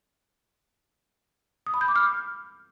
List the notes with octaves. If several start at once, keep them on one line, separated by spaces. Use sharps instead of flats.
D#6
B5
G6
D6
F6